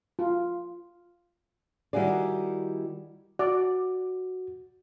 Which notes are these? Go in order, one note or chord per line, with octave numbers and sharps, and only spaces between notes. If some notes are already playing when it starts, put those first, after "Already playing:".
F4
D#3 G3 E4 F#4 G#4 D5
F#4 D5